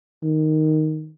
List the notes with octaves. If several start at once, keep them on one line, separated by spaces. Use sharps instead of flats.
D#3